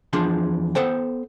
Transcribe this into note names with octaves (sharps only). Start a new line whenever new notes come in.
E2 F3 D4 G#4 C6
B3 A4 C5 G5